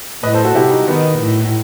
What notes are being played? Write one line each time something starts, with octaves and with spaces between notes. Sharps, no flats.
A2 B4 D#5
A4 C5
F#4 A4
C3 E4 G4
D#4 F#4
D#3 B3 D#4
A2